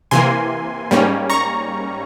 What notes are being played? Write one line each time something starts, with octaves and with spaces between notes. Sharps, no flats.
C3 E3 A#3 G#5 C6
G#2 G3 A#3 C#4
A#5 C#6